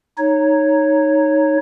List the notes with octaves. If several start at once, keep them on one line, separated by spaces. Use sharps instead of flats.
D#4 C#5